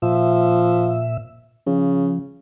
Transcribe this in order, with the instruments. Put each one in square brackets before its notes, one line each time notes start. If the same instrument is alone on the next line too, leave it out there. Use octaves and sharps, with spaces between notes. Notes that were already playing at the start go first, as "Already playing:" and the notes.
[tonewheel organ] A#2 E5 [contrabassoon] F3
[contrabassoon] C#3 [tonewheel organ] F3